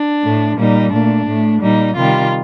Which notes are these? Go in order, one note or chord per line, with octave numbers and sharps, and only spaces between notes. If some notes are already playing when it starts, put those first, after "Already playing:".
Already playing: D4
A2 A3
A#2 G3 D#4
A#2 A3 D4
A2 A3
A#2 G3 D#4
C3 D#3 G3 F4